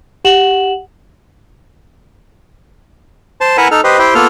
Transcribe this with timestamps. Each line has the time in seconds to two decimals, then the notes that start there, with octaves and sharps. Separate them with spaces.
0.25 G4 F#5 E7 F#7
3.41 C5 A5
3.58 E4 A#4 B4 E5 F#5 G#5
3.71 D#4 A4 F6
3.84 G4 B4 C5 D#5
3.99 E4 G4 C5 G5
4.15 A#3 B3 F4 A4 F6